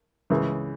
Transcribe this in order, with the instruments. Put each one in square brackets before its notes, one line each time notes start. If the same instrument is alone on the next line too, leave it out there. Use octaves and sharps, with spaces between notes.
[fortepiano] C#2 C#3 E3